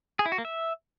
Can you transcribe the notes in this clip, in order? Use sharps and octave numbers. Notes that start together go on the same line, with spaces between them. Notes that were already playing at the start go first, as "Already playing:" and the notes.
G#4
E4
F#4
A#3
E5